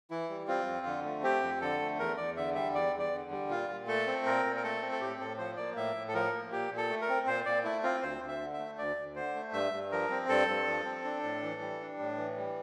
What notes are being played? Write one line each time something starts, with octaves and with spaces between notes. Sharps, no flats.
E3 E4
G3
C4 F4
F2
D3
A3
C4 G4
F2
D3 A4
A3
E2 A#4
E2 D5
D3 E5
G3 E5
E2 D5
E2
D5
D3
G3
A#2 F4
A#2
A3 A4
C4
A#2 A#4
A#2
A#4
A3 A4
C4
A4
A2 G4
A2 A4
F3 C5
A#3 D5
A2 E5
A2
A4
F3 A#4
A#3
A#2 G4
A#2
A4
A3
A#4
C4
A#2 C5
A#2 D5
A3 E4
C4 F4
D2 C5
D2
E5
D3
E5
A3
D2 D5
D2
D3 C5
A3
G2 E5
G2
F3 A#4
C4
G2 A4
G2
F3
C4
D4
A2
E3
G3
D4
A2
E3
G3